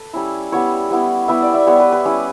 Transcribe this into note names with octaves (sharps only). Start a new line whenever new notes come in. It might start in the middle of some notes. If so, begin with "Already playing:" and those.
Already playing: A4 B4
G3 C#4 E4
G3 B3 E4 C#5
G3 B3 E4
G3 B3 E4 E5
D5
E5
G3 B3 E4 C#5
B4
B4
G3 C#4 E4